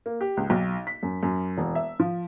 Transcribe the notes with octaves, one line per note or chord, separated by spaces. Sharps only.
A#3
G4
C#2
B1
B6
F#2
F#2
E1
E5
F3